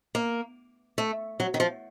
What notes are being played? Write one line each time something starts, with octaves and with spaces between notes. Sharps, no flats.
A#3
A3
F#3
D#3
F3